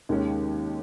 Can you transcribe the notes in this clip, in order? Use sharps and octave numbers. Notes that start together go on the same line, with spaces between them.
D#2 D#3 G#3 C#4